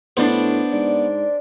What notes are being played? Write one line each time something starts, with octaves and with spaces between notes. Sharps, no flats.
A2 B3 D4 C5
G#2 D5